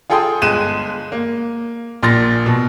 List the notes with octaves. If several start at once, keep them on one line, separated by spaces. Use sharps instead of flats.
F4 G#4 A4 G5 C6 D#6
G1 G#3 F#6 D#7 E7
A#3
A#1 A#2 C6 F6 A6 A#6
B2